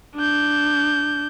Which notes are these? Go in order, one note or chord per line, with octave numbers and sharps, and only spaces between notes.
D4 G6